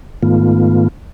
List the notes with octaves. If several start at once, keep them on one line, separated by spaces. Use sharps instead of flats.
G#2 D#3 A3 B3 F4